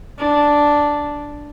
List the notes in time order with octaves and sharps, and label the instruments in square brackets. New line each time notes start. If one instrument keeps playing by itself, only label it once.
[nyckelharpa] D4